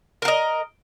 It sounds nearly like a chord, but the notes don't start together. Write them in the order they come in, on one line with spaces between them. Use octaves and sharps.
A#4 F5 D#5